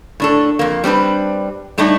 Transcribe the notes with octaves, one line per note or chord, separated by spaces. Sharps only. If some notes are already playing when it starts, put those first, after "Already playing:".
A2 D4 A4
F2 A#3
G3 C4 D4 B4
A2 G3 A3 D4 D#4 D#5